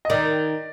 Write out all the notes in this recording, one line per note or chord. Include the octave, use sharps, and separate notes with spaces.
D#5
D#3 D5